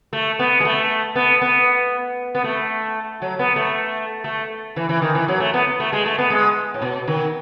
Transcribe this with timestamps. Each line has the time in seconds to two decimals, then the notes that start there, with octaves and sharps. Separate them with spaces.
0.13 A3
0.39 B3
0.60 G#3
0.65 A3
1.15 B3
1.41 B3
2.35 B3
2.44 A3
3.22 F#3
3.39 B3
3.56 A3
4.24 A3
4.76 E3
4.89 E3
5.02 D#3
5.15 E3
5.28 F#3
5.40 A3
5.54 B3
5.80 A3
5.93 G#3
6.06 A3
6.18 B3
6.30 G#3
6.74 A2
6.82 B2
7.07 D#3